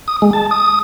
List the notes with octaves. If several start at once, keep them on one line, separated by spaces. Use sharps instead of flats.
D#6
G#3
A5
D#6